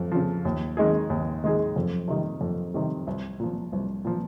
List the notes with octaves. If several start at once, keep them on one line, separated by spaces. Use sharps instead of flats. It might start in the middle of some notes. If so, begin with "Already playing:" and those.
Already playing: F2
C#3 F3
D#2
D#3 G#3 D#4 G#4
D#2
D#3 G#3 D#4 G#4
F2
C3 D#3 G3
F2
C3 D#3 G3
C2
A#2 F3
C2
A#2 F3